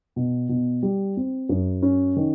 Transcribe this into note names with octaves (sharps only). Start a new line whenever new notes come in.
B2
B2
G3
C4
F#2
C#4
D#3